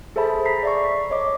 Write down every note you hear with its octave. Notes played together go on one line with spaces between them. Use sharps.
G#4 A4 C5 E5 A5 B5
A#5 B6 C7
D5 E5 C#6
C#5 D#5 D6